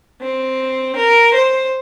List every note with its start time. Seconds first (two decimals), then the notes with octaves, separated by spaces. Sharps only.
0.21 C4
0.96 A#4
1.34 C5